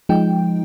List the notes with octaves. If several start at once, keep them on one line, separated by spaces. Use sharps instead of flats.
F3 G#3 D#4 G5